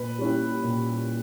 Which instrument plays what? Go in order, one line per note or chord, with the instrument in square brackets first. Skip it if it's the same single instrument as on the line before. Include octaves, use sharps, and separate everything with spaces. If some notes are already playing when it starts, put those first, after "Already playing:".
Already playing: [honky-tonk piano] A#2 [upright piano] B4
[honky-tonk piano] G3 C#4 E4 G4
A#2